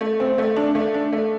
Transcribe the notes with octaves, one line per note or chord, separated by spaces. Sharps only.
A3
C4
A3
D4
A3
D4
A3